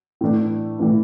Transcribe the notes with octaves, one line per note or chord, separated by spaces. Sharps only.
A2 E3 A3 D4
A2 E3 A3 D4